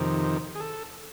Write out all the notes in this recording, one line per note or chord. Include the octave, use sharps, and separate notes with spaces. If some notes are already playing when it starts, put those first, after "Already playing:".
Already playing: F2 C3 D#3
G#4
A4